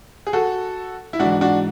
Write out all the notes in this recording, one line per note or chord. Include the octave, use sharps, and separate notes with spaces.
G#4
F#4 A4
E4
G#2 E3 D4 F#4
D4 F#4